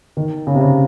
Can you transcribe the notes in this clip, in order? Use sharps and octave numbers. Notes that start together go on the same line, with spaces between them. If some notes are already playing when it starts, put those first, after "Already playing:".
D#3
C#3
C3
C#3